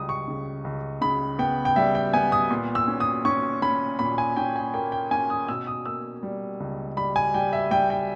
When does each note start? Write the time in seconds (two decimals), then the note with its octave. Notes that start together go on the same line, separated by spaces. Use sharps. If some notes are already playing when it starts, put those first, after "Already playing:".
Already playing: C#2 G3 D#6
0.09 C#6
0.28 C#3
0.64 C#2
1.01 C#3 B5
1.39 B3 G5
1.65 G5
1.76 G3 E5
1.95 G5
2.13 B3 G#5
2.32 D#6
2.51 A#2
2.75 E6
2.88 C#4
3.00 D#6
3.25 C#4 C#6
3.62 C#4 B5
3.99 A#2 B5
4.18 G#5
4.36 C#4 G5
4.56 G#5
4.74 A#3 G5
4.92 G5
5.11 C#4 G#5
5.30 D#6
5.48 B2 E6
5.67 D#6
5.86 A#3 E6
6.23 G3
6.60 C#2
6.97 G3 B5
7.16 G#5
7.34 G3 G5
7.53 E5
7.71 G3 G5
7.90 G5